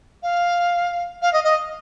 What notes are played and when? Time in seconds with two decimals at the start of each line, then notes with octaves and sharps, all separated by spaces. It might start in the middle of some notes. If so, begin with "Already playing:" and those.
0.23 F5
1.22 F5
1.33 D#5
1.44 D#5